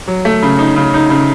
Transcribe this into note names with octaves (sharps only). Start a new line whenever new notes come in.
F#3
A3
C#3
D#4
C#3
D#4
C#3